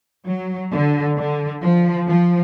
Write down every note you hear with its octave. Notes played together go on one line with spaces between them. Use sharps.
F#3
D3
D3
F3
F3